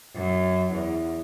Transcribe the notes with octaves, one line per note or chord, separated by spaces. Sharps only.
F#2
E2